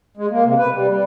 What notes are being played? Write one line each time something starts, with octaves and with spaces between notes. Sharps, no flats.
G#3
A#3
C3
B4
G3
G3